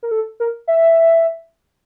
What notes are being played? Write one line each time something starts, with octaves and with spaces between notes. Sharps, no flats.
A#4
A4
A#4
E5